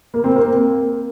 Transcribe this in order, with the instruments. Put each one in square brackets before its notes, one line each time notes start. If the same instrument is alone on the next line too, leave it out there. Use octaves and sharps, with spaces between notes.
[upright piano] A#3
C4
A#3